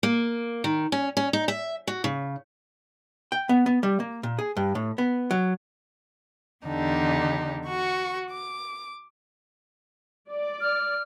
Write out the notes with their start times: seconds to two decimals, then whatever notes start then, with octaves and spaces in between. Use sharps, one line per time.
0.03 A#3
0.64 D#3
0.92 C#4
1.17 C#4
1.33 D#4
1.48 E5
1.87 F#4
2.04 C#3
3.32 G5
3.49 B3
3.66 B3
3.83 G3
4.00 A#3
4.23 A#2
4.39 G#4
4.57 G2
4.75 A2
4.98 B3
5.31 F#3
6.65 E2 D3 D4 D#4 G4
7.66 F#4 C#6
8.29 D6
10.30 D5
10.61 F6